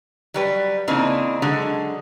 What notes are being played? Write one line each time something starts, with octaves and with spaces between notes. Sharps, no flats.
F#3 G3 B4
C#3 E3 A#3 C4 D4 D#4
D3 F#3 G#3